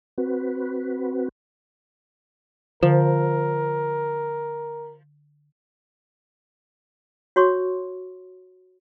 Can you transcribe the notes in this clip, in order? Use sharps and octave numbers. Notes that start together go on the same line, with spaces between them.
C4 F#4 B4
D3 F3 A#4
F#4 C#5 C6 C#6